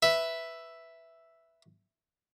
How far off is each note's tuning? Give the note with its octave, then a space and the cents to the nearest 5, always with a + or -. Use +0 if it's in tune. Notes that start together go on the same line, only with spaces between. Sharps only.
B4 +0 E5 +0